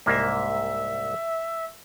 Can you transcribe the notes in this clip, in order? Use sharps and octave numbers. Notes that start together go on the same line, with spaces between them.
C2 G#2 A#3 E5